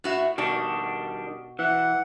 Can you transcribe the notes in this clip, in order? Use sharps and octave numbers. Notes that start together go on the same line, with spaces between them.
A2 F#4 E5
B2 D#3 G3 D4 F#4
E3 F#5